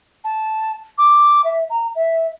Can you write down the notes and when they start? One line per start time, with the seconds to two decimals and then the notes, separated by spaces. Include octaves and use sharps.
0.24 A5
0.98 D6
1.44 E5
1.70 A#5
1.95 E5